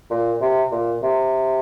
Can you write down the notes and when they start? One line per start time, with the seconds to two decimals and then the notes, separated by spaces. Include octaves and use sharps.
0.10 A#2
0.41 C3
0.72 A#2
1.03 C3